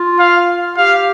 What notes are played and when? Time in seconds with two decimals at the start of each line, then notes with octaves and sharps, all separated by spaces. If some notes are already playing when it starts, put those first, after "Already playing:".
Already playing: F4
0.19 F5
0.77 G4 F5